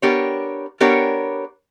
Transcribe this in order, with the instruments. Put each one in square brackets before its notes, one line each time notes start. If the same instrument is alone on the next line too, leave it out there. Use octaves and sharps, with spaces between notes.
[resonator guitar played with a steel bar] B3 D4 G4 A#4 C#5
B3 D4 G4 A#4 C#5